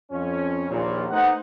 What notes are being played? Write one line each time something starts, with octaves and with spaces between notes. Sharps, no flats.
F2 C#4
A#1 D#2 A#2
A3 B3 D#4 C5 F#5